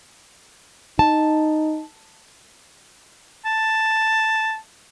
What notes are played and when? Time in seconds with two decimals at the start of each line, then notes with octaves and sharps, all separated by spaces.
0.99 D#4 A5
3.46 A5